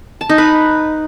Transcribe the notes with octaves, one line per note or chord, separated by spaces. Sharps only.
A5
D#4
B4